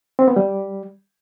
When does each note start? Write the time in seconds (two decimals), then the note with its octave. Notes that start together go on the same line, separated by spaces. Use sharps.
0.19 C4
0.28 B3
0.36 G3